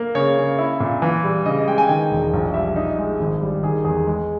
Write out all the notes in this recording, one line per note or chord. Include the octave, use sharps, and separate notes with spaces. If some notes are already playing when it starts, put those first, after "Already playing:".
Already playing: A#3
C#3 C#5
C#3
E4
A#2
E3
G3
C#3 D#5
G#3 G5
G#5
D#3 G5
E1
A#1
G3 E5
D#4
G#3
G#1
G3
D#3 G#4
E2 G#4
G#3